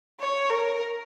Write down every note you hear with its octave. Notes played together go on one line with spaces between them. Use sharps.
C#5
A#4